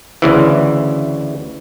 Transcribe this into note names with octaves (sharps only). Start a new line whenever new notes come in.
D2 C#3 E3